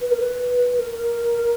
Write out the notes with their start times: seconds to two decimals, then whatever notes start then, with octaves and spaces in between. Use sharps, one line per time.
0.01 B4
0.11 A#4
0.20 B4
0.79 A#4